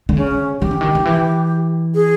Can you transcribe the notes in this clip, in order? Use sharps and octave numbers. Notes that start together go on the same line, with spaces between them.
D3
C#3 C#4
D#3 G4
D3
D#3
D#3
E3
G#4